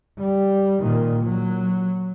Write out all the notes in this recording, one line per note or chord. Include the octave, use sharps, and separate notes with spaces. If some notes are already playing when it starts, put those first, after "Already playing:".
G3
A#2 D#3
F#3